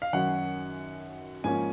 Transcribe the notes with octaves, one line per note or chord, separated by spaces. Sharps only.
F5
F#2 D#3 F#3 C#4 F#5
G#2 F3 A#3 C#4 G#5